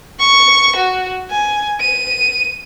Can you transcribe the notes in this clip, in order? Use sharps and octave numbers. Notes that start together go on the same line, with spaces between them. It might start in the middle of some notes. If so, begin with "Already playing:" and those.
C#6
F#4
G#5
D#7